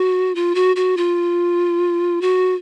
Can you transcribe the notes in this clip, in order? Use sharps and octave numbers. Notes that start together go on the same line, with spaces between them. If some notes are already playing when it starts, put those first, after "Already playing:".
Already playing: F#4
F4
F#4
F#4
F4
F#4